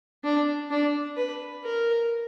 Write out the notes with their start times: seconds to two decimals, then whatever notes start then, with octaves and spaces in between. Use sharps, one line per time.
0.24 D4
0.71 D4
1.17 B4
1.64 A#4